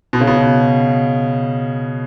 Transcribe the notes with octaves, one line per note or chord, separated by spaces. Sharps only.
B2
C#3
B2